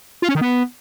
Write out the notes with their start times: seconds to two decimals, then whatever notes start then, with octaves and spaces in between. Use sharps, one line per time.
0.22 F4
0.29 C#4
0.35 D#3
0.41 B3